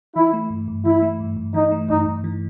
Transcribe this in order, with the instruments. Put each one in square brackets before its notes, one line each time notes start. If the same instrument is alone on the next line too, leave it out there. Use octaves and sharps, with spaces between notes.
[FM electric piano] E3 [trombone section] E4
[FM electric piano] A3
G2
G2
[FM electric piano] E3 [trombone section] E4
[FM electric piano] A3
G2
G2
[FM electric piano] E3 [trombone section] D#4
[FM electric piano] A3
[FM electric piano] G2 [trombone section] D#4
[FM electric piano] G2
E3